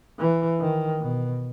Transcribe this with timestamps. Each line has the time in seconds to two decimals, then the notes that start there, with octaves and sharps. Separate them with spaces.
0.19 E3
0.60 D#3
1.01 B2